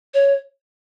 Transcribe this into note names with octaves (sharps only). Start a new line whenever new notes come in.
C#5